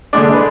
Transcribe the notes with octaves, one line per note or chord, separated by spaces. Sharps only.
D3 G#3 D4 D5
B4